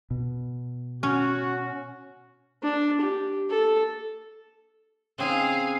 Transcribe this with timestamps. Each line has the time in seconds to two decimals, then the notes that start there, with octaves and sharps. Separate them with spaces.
0.11 B2
1.03 C#4 F#4
2.63 D4
3.00 G4
3.50 A4
5.18 C#3 C4 D#4 G#4 F5